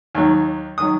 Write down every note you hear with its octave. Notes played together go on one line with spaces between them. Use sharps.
D#2 D#3 F#3
D#3 F#3 D#6